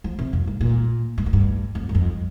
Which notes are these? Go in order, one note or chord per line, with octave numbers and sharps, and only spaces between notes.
F3
C3
F2
G2
A#2
G2
A#2
G2
F2
G2
F2